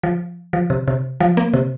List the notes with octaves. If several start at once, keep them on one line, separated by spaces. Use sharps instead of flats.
F3
F3
C3
C3
F3
A#3
C3